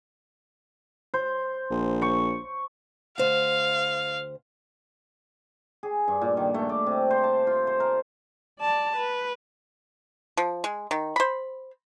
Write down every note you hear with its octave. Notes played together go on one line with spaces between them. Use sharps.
C5
A#1
C#6
D2 C5 F5
G#4
G2
A#2
D#3
A3
D5
C3
C5
A5
F4
C5
A#4
D5 A5
B4
F3
G#3
D#3
C5 B5